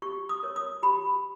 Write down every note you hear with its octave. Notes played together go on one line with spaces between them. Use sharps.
G4 C#6
D#6
A#4 C#5
D#6
G4 B5